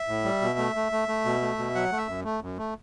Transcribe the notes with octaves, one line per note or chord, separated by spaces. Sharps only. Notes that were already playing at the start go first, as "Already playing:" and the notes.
Already playing: E5
A2
G3
B2
A3
A3
A3
A3
B2
A3
B2
F#3 F#5
A3
E5
F#2
A3
F#2
A3